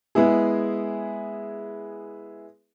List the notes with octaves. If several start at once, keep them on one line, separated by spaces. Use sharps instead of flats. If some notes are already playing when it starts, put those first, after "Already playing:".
G#3 B3 E4 G#4